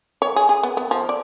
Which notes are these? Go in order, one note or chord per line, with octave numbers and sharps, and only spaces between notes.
C#5
G#4
G#4
B3
B3
F3
D5